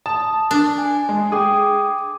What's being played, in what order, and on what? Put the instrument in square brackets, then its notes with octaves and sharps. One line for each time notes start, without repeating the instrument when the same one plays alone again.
[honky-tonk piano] A5 [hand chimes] D#6
[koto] D4
[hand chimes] G#5
[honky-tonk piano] G#3
[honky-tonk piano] G#4 [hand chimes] G5 D6 D#6